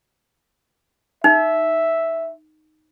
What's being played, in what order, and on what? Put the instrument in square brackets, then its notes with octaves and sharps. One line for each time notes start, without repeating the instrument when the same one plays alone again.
[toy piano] D#4 [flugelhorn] E5